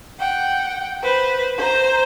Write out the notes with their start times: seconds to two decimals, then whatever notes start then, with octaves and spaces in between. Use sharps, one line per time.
0.19 F#5 G5
1.03 B4 C5
1.58 C5 A#5